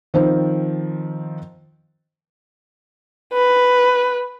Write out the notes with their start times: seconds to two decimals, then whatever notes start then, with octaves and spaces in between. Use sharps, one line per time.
0.14 D#3 F3 C4
3.33 B4